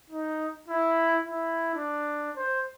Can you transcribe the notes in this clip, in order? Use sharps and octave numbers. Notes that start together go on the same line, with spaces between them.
D#4
E4
E4
D4
C5